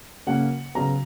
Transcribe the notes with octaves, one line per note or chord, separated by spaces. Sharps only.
C#3 F#3 A#3 C#4 F#5
C#3 F#3 B3 A#5